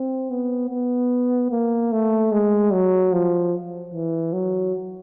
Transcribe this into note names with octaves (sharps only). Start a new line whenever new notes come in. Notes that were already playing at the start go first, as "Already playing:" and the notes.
Already playing: C4
B3
B3
A#3
A3
G#3
F#3
F3
E3
F#3